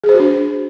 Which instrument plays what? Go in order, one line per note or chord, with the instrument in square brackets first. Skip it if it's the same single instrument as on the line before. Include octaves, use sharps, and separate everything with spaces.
[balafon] G#4
C5
F#4
D4